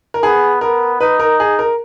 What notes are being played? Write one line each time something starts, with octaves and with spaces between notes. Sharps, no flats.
A#4
B3 G#4
B3 A#4
D#4 B4
A#4
G#4
A#4